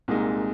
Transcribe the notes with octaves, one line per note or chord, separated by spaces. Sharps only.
C2 A#2 G#3 D#4